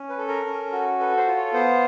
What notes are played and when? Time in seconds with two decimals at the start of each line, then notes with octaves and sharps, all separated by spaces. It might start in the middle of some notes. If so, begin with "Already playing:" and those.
Already playing: C#4
0.09 B4
0.18 A4
0.28 A#4
0.45 C#4
0.72 F#4
0.99 A4 B4
1.17 C5
1.27 F4
1.36 C#5
1.54 B3 C5